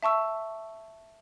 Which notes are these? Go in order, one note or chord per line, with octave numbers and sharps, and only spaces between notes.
E5 A5 C#6 E6